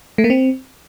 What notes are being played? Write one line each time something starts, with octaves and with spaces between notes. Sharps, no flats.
A3
A#3
C4